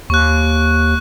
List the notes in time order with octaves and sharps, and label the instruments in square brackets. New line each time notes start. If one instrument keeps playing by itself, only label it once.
[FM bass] D#2 [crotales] C#6 F#6